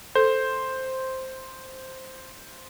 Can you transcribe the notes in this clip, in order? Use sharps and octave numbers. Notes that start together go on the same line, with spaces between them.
A4 C5